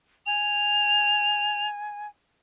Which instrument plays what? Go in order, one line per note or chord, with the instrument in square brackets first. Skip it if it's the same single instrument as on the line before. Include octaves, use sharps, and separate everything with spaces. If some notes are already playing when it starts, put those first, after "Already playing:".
[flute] G#5 [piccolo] F7